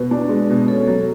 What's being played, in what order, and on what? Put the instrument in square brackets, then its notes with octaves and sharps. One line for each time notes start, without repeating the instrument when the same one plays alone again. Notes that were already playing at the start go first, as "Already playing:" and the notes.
Already playing: [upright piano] B2 [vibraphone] B4
[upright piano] D4
G#3
B2
[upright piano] C#4 [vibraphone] A4
[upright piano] F#3 [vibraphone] A4